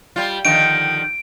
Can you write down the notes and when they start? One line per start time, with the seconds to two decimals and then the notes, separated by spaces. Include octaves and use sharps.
0.16 G3 F4
0.45 D3 D#3 F3 D7